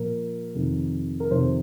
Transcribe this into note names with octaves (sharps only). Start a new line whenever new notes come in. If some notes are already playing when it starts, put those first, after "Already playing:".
Already playing: A#2 F3 A#4
F2 C3 D#3
A#4
F2 C3 D#3 C5